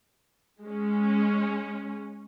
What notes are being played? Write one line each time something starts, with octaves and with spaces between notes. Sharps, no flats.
G#3 C#4